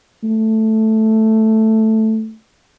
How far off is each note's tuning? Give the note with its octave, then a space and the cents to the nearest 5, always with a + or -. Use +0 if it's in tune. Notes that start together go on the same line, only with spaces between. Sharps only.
A3 +0